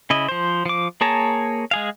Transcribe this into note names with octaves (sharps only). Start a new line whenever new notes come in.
C#3 E4 D#5
F3 C5
F3 D6
A#3 G#4 C#5 A5 A#5
G#3 G#4 F5